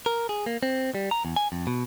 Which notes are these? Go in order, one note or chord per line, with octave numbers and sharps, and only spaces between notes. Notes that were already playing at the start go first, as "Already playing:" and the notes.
A#4
G#4
A#3
C4
G3
A#5
E2
G#5
F2
B2